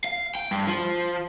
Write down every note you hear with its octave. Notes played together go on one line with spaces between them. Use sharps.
F5
G5
G2
F3